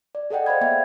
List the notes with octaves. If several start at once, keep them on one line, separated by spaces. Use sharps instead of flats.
D5
G#4 A4 D5 D#5 F#5 G5
C5 D5 F5 B5 G#6
A#3 B3 E5 G5 G#6